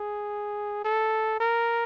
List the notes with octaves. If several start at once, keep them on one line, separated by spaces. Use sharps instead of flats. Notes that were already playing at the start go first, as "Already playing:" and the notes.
Already playing: G#4
A4
A#4